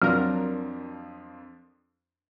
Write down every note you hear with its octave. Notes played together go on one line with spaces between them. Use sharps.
F2 F3 F#3 D4 A#4 F6